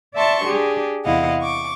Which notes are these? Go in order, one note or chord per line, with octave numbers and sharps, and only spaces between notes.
D5 E5 A5 C6 C#6
D4 G4 G#4
E2 C3 E4 D#5 F5 F#5
C#6 D6